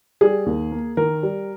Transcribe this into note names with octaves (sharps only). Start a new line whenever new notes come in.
G3 G#4
D#2
A#3
D#3 A#4
G3